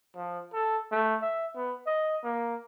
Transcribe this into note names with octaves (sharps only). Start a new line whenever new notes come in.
F3
A4
A3
E5
B3
D#5
A#3